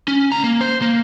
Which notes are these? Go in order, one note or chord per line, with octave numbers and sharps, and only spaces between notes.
C#4
D2 A#5
A#3
C5
A#3